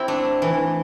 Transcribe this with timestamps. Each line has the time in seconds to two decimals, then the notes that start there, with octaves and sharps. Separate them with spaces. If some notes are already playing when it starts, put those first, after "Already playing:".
Already playing: C4 E4 G4
0.08 A3 D4
0.42 E3